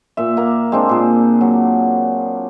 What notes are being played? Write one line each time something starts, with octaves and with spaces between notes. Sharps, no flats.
A#2 E5
A#3 A#5
G#3 C4 D4
A#2 G#4
F#3